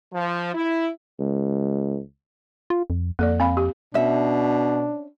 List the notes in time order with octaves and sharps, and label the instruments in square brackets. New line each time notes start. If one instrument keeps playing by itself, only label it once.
[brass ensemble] F3
E4
[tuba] C#2
[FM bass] F4
F2
[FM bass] F2 [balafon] A#3 A4 D5
[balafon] C4 F5 B5
G4
[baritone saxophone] B2 [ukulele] C#4 E5 [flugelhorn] D4